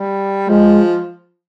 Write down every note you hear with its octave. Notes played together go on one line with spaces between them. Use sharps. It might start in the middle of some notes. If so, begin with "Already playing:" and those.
Already playing: G3
F3 G#3